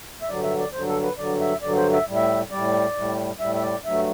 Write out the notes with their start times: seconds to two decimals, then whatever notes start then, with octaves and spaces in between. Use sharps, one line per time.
0.22 E5
0.29 G2 D3 F#3 D5
0.43 E5
0.58 D5
0.73 G2 D3 F#3 C5
0.88 A4
1.02 B4
1.18 G2 D3 F#3 D5
1.41 E5
1.62 G2 D3 F#3 D5
1.77 C5
1.92 E5
2.07 A2 G3
2.16 E5
2.51 A2 G3 D5
2.95 A2 G3
3.40 A2 G3 E5
3.55 E5
3.62 D5
3.84 G2 F#3 A3 E5